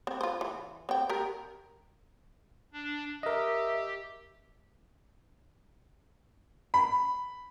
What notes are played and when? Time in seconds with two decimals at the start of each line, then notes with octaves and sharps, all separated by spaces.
0.07 C4
0.21 F4 C5
0.41 E3
0.89 C4 G5
1.09 G4 A#4
2.73 D4
3.23 G4 A#4 D#5 E5
6.74 B5